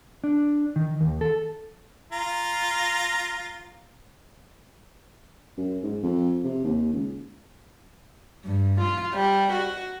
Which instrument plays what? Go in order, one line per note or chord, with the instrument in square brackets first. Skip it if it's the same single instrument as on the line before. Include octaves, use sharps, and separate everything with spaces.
[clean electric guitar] D4
D#3
D#2
A4
[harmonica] F4 A#5
[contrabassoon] F#2
G#2
F2
C3
D#2
C#2
[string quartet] G2
F4
G3
F#4